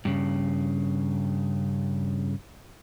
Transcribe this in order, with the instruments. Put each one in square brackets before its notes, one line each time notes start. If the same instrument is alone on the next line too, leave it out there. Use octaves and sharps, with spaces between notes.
[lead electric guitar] G2 C#3